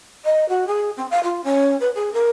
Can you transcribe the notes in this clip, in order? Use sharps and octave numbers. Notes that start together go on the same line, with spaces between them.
D#5
F#4
G#4
C4
F5
F4
C#4
B4
G#4
A#4